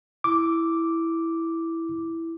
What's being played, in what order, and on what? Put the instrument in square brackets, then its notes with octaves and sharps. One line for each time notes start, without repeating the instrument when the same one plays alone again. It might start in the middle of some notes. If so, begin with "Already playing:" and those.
[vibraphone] E4 [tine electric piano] D6